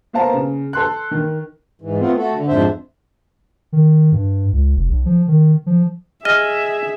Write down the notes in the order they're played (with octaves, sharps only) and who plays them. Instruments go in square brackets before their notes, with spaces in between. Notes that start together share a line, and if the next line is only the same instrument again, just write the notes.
[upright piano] A#3 B3 C5 F5 A5 A#5
C#3
A4 C6 F#6
D#3
[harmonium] G#2 E3
A3 B3 C4 F4
A3 F#4 A4
D3
F2 G#2 D4 C5 E5
[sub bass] D#3
G2
C#2
F1
B1
F3
D#3
F3
[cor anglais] G#4 [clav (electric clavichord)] D#5 [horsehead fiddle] E5 [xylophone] F6 A#6